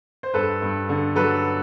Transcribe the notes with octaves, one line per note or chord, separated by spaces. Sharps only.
C5
G2 A4 B4
G2
D3
F#3 A4 B4